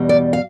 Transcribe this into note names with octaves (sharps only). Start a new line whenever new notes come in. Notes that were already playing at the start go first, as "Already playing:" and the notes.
Already playing: E2 B2 G3
D5
F5